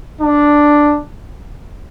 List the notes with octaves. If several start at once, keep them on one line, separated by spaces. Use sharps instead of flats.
D4